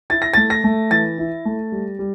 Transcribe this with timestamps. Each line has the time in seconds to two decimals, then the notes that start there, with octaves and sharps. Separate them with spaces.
0.10 E4 A6
0.22 A#6
0.34 A6
0.37 A3
0.50 A#6
0.64 A3
0.91 E3 A6
1.18 E4
1.45 A3
1.72 G3
1.99 G3